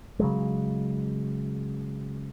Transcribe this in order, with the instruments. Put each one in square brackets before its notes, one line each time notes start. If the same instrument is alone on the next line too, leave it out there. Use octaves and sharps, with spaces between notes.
[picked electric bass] C#3 F#3 G#3